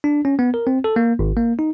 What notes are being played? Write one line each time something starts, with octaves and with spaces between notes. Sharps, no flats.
D4
C#4
B3
A#4
C4
A4
A#3
G#1
A#3
D#4